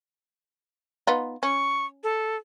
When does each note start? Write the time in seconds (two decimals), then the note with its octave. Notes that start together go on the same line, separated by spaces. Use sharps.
1.07 B3 D#4 F4
1.43 C#4 C#6
2.03 A4